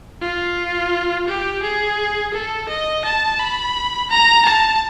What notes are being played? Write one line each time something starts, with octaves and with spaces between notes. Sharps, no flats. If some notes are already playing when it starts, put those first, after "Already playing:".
F4
G4
G#4
A4
D#5
A5
B5
A#5
A5